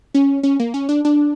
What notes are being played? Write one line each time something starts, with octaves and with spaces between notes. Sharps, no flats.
C#4
C#4
A#3
C#4
D4
D4